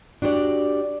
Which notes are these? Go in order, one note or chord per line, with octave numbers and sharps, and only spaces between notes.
D4 F#4 G4 C5 D5